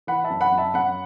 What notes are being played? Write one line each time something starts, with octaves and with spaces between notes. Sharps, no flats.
E3 F#5 B5
E5 A5
F#2
F#5 B5
F#2
E5 A5
F#2 F#5 B5